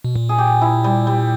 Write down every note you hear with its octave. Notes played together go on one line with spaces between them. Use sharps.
B2
A#2
G#4
G4
E4
G3
G3